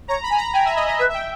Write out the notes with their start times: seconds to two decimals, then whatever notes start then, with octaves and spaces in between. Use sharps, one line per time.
0.08 C#5 A#5
0.23 B5
0.30 G#5
0.38 A#5
0.53 G5 G#5
0.65 E5
0.76 D#5
0.87 D#5
0.99 B4 E5
1.09 E5
1.14 G5